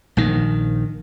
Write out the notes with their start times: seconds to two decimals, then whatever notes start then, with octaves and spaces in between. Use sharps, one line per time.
0.17 A#1 D#3